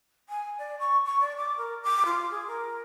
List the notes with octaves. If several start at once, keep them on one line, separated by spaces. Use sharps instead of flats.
G#5
D5
C#6
C#6
D5
D6
A#4
D6
F4
G#4
A#4